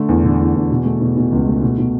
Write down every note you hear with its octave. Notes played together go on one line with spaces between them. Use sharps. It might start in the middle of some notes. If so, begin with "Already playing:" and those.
Already playing: D3 A3
E2
D3
E2
E2
B2
A3
B2
B2
C#2
A3
B2
B2